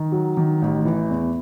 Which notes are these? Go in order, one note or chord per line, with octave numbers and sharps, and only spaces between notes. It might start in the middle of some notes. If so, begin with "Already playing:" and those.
Already playing: D#3
F#3
D#3
A1
E3
E2